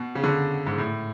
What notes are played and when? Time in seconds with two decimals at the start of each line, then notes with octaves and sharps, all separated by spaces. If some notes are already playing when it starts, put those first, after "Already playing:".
Already playing: B2
0.15 C#3
0.24 D3
0.67 G#2
0.78 A2